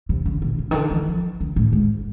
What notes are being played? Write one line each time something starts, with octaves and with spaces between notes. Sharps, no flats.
C3
D3
A#2
C#3
D#3
D3
E3
F3
D3
A2
G#2